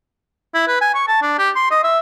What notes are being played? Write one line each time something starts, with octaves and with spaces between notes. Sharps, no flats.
E4
B4
G#5
C#6
A5
D4
G4
C6
D#5
E5